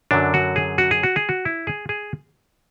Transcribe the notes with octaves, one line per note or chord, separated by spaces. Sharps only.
F#2 D3 F#3 D4
F#4
G#4
F#4
G#4
F#4
G#4
F#4
E4
G#4
G#4